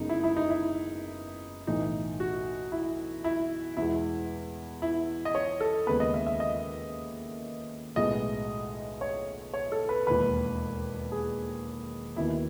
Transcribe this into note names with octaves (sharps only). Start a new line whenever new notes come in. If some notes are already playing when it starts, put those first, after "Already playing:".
Already playing: F#1 F#2 C#3 G#3 B3 D#4
E4
E4
D#4
E4
B1 A2 E3 D#4
F#4
E4
E4
E2 B2 G#3 E4
E4
D#5
C#5
A4
D#2 C#3 G#3 B3 B4
D#5
E5
E5
D#5
B1 A2 G#3 B3 D#5
C#5
C#5
A4
B4
E1 D#2 D#3 B4
G#4
D#2 D#3 F#3 B3 E4